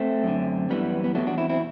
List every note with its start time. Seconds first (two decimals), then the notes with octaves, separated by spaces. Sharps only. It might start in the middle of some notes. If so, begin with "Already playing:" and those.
Already playing: A3 C4
0.24 F#2 D3
0.70 F#2 E3 G3 B3
1.04 B3
1.15 E2 B2 F#3 A3
1.27 D4 F#4
1.38 C4 E4
1.49 C4 E4